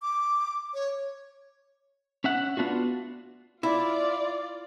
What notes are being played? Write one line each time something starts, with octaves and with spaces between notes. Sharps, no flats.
D6
C#5
C#4 E5 F#5
B3 D4 F4 F#4
E4 F4 D5